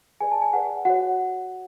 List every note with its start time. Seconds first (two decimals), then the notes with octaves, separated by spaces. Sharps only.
0.21 G#4 B4 D5 G#5
0.32 A5
0.42 G#5
0.53 G#4 B4 D5 F#5
0.85 F#4 C#5 F#5